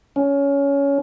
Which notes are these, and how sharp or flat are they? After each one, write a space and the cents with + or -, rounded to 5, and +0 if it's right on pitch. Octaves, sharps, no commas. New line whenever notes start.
C#4 +15